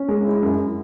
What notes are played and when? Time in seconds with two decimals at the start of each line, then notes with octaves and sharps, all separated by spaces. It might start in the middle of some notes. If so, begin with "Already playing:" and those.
Already playing: C#4
0.08 G#3
0.25 E4
0.42 F#2